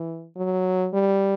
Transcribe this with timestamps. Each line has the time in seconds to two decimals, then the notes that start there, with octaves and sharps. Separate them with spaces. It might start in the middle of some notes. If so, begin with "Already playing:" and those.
Already playing: E3
0.36 F#3
0.94 G3